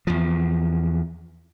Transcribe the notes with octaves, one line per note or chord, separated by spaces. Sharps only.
E2 F3